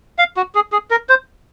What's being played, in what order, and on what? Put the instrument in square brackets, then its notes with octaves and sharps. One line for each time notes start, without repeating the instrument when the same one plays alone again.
[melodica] F5
F#4
G#4
G#4
A#4
C5